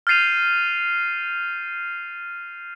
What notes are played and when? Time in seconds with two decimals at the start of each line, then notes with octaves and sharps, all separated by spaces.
0.07 F6 G6 A6 C7 D#7 F7